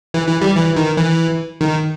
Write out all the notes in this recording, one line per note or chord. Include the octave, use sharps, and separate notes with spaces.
E3
E3
G3
E3
D#3
E3
D#3